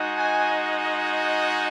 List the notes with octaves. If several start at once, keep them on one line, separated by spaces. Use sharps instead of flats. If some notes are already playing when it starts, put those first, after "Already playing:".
Already playing: G#3 D#4 F#4
G#5